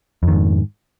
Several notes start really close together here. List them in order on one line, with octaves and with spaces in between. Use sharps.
F2 D#3 G#2